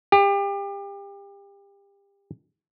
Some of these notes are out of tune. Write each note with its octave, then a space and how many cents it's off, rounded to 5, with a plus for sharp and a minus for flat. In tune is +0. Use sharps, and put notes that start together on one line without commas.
G4 +30